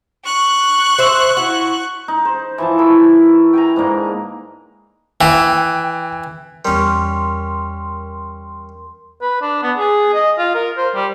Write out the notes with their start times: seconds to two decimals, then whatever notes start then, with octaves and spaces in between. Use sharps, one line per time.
0.25 C#6 F#6
0.99 C5 E5
1.37 E4 F#4
2.08 D#4
2.25 C5
2.58 E3 F3 A5
2.78 E4 A#4 C#5 E5
3.53 G5 G#5 A#5
3.76 G#2 D3 A#3
5.21 E3 G5
6.65 E2 G3 C#4 A#4 C6
9.22 B4
9.42 D4
9.63 B3
9.77 G#4
10.14 D#5
10.38 F4
10.54 A#4
10.77 C5
10.95 G3